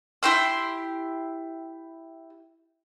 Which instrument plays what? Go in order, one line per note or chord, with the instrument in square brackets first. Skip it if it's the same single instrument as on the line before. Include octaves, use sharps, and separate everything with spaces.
[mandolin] E4 G4 C6 E6